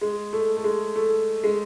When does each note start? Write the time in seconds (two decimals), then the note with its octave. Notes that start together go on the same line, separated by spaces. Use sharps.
0.01 G#3
0.33 A3
0.57 A3
0.64 G#3
0.96 A3
1.43 G#3